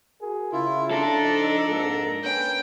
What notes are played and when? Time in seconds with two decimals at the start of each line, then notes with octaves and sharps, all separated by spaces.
0.22 F#4 G#4 A#4
0.52 C#3 E4 F4
0.91 D4 A4 A#5
1.24 F3 D#4
1.68 F2 G#2 A#3
2.23 A#3 C#4 B4 G5 G6